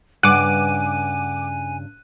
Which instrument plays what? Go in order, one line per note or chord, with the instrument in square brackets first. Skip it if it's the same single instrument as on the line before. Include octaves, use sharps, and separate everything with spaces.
[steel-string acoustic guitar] G2 C#3 [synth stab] F#5 D6 [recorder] G#5 [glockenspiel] F#6 D#7